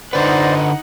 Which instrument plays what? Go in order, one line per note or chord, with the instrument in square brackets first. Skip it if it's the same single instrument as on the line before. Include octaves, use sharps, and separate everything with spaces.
[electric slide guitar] D3 B4 [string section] D#4 F#5 [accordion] C5 D5